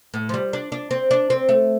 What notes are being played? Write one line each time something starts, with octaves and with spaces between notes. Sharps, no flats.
A2
F3
G3
D4
D4
C4
D4
C4
A3